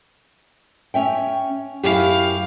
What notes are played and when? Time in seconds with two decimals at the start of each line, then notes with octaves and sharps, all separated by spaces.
0.94 C#4 E5 G5
1.83 F#2 E4 G4 F5